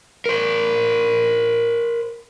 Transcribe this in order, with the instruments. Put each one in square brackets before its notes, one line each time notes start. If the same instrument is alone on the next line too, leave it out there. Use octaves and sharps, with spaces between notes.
[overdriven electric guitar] A#4 C5